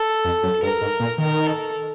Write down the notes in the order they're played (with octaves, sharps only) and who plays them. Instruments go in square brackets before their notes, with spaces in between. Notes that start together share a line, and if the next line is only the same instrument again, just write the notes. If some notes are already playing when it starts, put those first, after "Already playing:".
Already playing: [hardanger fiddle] A4
[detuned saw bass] F2
F#2
[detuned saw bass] G2 [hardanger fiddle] A#4
[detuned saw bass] G#2
A#2
[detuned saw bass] D#3 [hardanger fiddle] A#4
[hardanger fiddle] A4